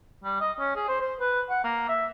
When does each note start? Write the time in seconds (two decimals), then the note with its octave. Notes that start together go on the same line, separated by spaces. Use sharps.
0.24 G3
0.40 D#5
0.59 C#4
0.76 G#4
0.88 C5
1.01 C5
1.20 B4
1.49 F#5
1.64 A#3
1.88 E5